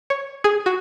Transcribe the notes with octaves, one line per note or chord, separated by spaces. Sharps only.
C#5
G#4
F#4